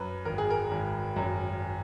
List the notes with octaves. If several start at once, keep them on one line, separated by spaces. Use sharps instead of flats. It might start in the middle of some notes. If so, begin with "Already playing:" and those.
Already playing: F#2 B4
G#1 A#4
G#4
A#4
G#1
F#2